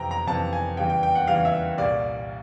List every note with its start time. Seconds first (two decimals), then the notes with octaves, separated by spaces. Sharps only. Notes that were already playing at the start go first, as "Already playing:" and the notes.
Already playing: F2 C3 E3 G5 A#5
0.11 A#5
0.27 F2 C3 E3 A5
0.53 G#5
0.77 E2 C#3 E3 G3 G5
0.90 G5
1.03 G5
1.15 F#5
1.27 E2 C#3 E3 G3 F5
1.45 E5
1.78 C2 A#2 G3 A#3 D5